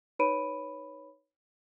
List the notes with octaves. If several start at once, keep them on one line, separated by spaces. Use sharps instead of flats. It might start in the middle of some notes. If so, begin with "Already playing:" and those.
D#4 B4 C#5 B5 D7 D#7